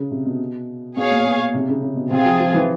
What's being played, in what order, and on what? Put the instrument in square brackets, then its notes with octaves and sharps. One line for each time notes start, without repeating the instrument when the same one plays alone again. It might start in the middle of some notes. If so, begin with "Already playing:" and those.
Already playing: [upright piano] C#3
C3
B2
[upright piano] B2 [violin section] G#4 C#5 F5
[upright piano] A#2
B2
C3
C#3
C#3
B2
[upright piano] C3 [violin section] C4 F4 G#4
[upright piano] F3
F3
E3